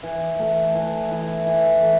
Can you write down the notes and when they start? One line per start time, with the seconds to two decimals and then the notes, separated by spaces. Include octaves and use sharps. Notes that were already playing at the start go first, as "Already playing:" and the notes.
0.03 E3
0.39 A3
0.75 E3
1.11 E4
1.46 E3
1.82 A3